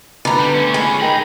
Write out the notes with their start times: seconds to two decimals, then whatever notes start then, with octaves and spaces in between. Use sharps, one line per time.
0.25 D3 B3 A#5 B5
0.40 G3
0.54 A3 C#4
0.74 G#3 C#4 G#4 B4 G#5
1.01 D#4 A#4 G5 A#5 B5